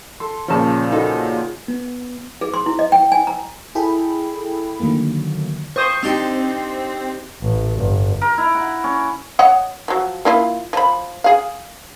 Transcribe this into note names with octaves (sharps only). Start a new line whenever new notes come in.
A4 C6
A#2 C#3 F3 C#4 A5
D#4 F#4 A4
B3
G#4
C6
E4
D#5
G5
G#5
A#5
E4 G#4 A4 G5 B5
D3 D#3 F#3 A3 A#3
C5 C#6 D#6
C4 D4 D#4 G4
A1
G1
A#4
E4
F#5
C#4
C#5 D#5 F#5
F3 F#3
A#3 E4 F4
F3 B5
G#4 F5